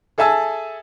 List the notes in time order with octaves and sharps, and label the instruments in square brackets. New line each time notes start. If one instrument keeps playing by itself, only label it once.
[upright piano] G#4 A4 E5 G#5 A5 E6